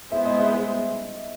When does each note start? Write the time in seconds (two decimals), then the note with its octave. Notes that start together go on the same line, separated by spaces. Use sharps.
0.12 G#3 B3 E4 G#4 C5 E5
0.25 D#5
0.38 E5